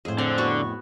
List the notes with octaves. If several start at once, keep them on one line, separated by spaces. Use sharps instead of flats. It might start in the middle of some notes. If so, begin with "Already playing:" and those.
F2 A2 G#4 C5
D3 C4
B3 F#4 C#6